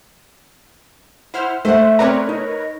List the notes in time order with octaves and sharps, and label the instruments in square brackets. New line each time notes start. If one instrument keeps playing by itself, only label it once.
[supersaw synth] E4 C5 F6 [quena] F#5
[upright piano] A3 [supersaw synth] C5 F#5 [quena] E5
[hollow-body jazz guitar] C4 D5 A#5 [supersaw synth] A#4 B4 C#5
[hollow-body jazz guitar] D#4 [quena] D#5